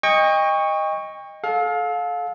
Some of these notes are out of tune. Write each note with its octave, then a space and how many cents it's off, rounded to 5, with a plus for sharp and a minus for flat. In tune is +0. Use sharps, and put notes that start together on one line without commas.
D#5 +0 G5 +35 C#6 +0
A4 -25 F5 +25